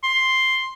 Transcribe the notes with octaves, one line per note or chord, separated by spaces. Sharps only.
C6